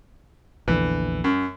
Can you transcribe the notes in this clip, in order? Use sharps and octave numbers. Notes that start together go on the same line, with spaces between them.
A#1 E2 D3 E3
F#2